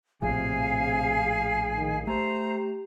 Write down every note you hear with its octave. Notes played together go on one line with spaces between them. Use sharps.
A#1 A2 C3 F3 G#4 F5 G#5
D#3
A3 G4 C5 A#5